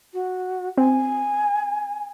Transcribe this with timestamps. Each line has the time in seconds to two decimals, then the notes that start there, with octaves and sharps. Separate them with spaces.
0.13 F#4
0.78 C4 G#5